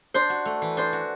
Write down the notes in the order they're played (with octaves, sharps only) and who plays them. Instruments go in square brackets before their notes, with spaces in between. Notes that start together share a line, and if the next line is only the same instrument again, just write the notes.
[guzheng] D4 [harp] C5
[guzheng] F#4
A3
E3
[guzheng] D4 [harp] C5
[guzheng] F#4